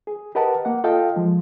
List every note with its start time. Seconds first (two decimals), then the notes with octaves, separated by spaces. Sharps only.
0.07 G#4
0.35 G4 A#4 B4 D#5 F#5 A5
0.65 A#3 F#5
0.84 F4 A4 D#5 F5 G5
1.16 F3 G#3